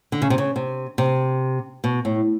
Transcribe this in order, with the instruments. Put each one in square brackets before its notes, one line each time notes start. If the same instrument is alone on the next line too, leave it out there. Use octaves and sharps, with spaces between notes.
[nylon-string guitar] D3
C#3
C3
C#3
C3
C3
B2
A2